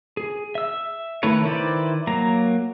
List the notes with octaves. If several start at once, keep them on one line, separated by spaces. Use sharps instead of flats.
G#4
E5 E6
D#3 A3 E4 B4 C#5
D#3 E4 B4 C5 D5
F#3 A#3 A#5